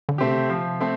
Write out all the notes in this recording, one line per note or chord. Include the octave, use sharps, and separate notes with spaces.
D3
B2 A3 C4 G4
C3
F3
A3 C4